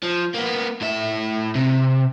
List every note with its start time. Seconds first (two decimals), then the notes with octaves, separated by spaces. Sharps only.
0.03 F3
0.34 A#3 B3
0.81 A2 E5
1.55 C3